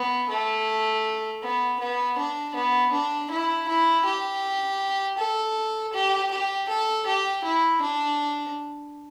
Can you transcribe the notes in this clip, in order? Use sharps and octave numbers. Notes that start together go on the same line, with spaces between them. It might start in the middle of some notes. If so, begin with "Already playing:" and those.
Already playing: B3
A3
B3
B3
D4
B3
D4
E4
E4
G4
A4
G4
G4
A4
G4
E4
D4